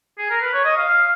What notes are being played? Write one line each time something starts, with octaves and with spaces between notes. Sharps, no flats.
G#4
A#4
B4
C#5
D#5
F5
F5